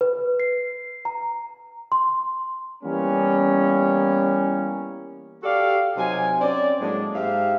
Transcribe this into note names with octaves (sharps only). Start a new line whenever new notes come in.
B4
C7
A#5
C6
E3 G3 A#3 B3 C#4
F#4 G4 A4 D5 F5
C3 F#3 D#4 G#5
C4 C#4 D5
A2 F#3 G#3 A#3 D4
G#2 G4 E5 F5